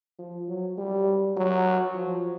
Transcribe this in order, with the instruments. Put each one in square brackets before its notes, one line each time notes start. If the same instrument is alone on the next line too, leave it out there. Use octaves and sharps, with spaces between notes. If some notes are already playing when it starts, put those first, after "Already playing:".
[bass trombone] F3
F#3
G3
F#3
F3